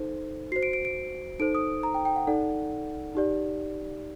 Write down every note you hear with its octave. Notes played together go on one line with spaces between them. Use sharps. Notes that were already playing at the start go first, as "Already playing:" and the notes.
Already playing: D#4 A4 C5
F#4 C5 C7
D7
D7
D7
D#4 A4 C5 D7
D#6
A#5
G5
G5
F#5
D#4 A4 D5 F#5
D#4 G4 D5